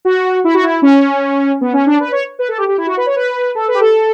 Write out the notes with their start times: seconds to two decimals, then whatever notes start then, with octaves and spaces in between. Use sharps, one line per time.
0.05 F#4
0.44 E4
0.54 F#4
0.63 E4
0.82 C#4
1.61 B3
1.73 C#4
1.86 D4
2.00 B4
2.12 C#5
2.39 B4
2.48 A4
2.58 G4
2.68 G4
2.78 E4
2.87 F#4
2.97 B4
3.06 C#5
3.16 B4
3.55 A4
3.68 B4
3.74 G4
3.80 A4